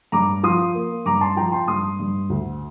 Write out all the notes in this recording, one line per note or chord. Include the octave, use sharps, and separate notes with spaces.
G2 A#5 D6
F3 C6 D#6
A#3
G2 A#5 D6
A5 C6
F3 G5 A#5
A5 C6
G2 C6 D#6
G2
D2